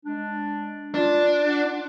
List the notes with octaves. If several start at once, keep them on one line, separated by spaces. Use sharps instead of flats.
G#3 D4
D4 F4
F#5